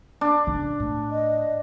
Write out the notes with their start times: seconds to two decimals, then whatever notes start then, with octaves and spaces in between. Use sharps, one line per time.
0.21 D4
0.47 A1 C#3
0.80 A2
1.11 D#5